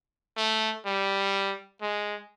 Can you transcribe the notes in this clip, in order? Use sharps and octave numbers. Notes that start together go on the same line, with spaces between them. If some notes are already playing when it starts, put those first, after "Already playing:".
A3
G3
G#3